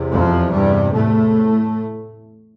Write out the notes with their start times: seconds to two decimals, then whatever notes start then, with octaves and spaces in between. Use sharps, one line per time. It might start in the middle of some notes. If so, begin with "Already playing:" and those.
Already playing: E2 C3
0.09 F2 F3
0.50 G2 G3
0.92 A2 A3